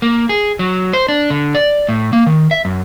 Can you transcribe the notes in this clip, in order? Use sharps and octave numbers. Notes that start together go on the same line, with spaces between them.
A#3
G#4
F#3
C5
D4
D3
D5
A2
A#3
D#3
E5
F#2